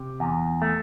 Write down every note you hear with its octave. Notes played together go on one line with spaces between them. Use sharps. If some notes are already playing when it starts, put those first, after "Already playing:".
Already playing: C3
E2
A3